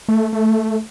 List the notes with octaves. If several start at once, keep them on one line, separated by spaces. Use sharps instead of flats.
A3
A3